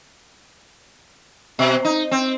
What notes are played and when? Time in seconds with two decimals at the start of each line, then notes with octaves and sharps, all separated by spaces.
1.59 B2
1.85 D#4
2.11 C4